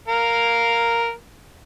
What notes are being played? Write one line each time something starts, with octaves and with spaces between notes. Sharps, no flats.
A#4 F5